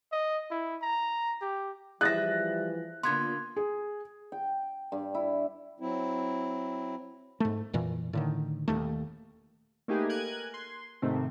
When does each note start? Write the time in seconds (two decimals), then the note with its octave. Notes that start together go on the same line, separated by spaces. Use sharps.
0.12 D#5
0.51 E4
0.82 A#5
1.41 G4
2.01 E3 F3 G3 G#4 E5 F#6 A6 A#6
3.03 A#2 D3 A#3 B3 C6 G#6
3.56 G#4
4.32 G5
4.92 G2
5.14 E4
5.80 F#3 C4 E4
7.40 G#2 A3
7.73 F2 A#2 E3
8.13 A2 D3 D#3
8.68 D#1 D#2 A3
9.88 A3 A#3 D#4 G4 G#4 B4
10.09 A#4 G#5 F#6 G#6
10.54 C6
11.02 G#2 C3 D#3 A3 C4